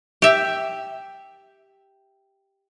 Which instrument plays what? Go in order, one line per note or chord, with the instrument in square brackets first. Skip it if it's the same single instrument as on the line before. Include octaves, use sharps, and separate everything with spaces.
[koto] G4 E5